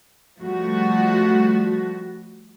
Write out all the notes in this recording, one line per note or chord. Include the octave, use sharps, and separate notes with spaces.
F3 G3 A3 F#4